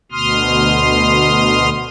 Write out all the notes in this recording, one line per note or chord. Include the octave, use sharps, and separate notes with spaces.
D2 B2 C6 D#6 F6